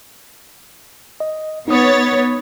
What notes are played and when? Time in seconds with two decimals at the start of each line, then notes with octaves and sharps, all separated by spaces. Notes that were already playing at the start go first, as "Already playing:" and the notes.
1.20 D#5
1.68 B3 D#4 C#5 D#6 A6